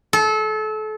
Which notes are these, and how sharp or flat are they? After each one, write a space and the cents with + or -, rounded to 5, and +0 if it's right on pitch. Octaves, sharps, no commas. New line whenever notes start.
A4 -30